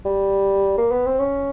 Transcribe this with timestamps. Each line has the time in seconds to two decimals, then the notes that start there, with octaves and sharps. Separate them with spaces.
0.05 G3
0.78 A#3
0.92 B3
1.06 C4
1.19 C#4